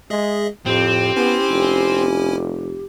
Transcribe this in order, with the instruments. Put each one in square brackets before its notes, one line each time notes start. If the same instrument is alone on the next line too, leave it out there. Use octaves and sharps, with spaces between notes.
[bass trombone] G#3 [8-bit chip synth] G#4 D#5 E5
[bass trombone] F2 [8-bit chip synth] A2 [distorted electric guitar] C4 [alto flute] G4
[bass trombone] B3 [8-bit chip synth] C#4 E4 G#5
[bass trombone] F1